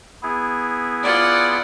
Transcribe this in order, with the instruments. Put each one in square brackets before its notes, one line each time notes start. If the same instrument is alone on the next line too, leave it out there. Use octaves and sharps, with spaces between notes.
[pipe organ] B3 E4 G#4
[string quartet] F4 D5 F#5